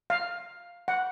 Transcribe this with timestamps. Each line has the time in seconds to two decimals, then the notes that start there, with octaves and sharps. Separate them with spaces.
0.10 F5
0.88 F#5